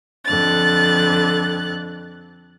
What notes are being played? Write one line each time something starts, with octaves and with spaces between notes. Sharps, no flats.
F2 D3 F#6 A6